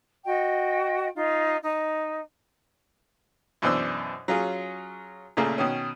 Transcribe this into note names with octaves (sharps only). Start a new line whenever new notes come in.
F#4 D#5 G5
D#4 F4
D#4
F#2 B2 E3 D4 C5 E6
F#3 C#4 F4 G#4
A#2 C#3 A3 A#3 G#4
B2 D#3 C#4